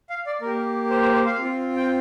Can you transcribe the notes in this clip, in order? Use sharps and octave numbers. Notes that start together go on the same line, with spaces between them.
F5
D5
A#3 G4 A#4
C5
C5
C5
F5
C4 F4
G5